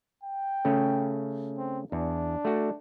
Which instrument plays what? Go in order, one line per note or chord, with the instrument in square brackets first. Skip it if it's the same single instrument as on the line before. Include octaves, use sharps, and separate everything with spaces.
[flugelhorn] G5
[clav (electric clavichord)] C#3 A3 C#4
[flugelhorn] C4
[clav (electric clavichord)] E2 [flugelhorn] D4
[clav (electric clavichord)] A3 F#4